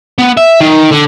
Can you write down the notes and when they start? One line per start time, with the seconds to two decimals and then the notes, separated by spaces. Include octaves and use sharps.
0.19 B3
0.37 E5
0.61 D#3
0.92 D3